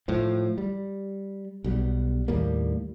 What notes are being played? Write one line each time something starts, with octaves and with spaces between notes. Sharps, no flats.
A2 F3
G3
B1 B2 G3
D#2 A2 G3 A#3